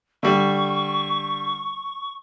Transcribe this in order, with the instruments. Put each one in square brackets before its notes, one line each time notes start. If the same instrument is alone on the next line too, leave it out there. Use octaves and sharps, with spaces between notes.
[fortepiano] D3 G3 [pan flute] C#6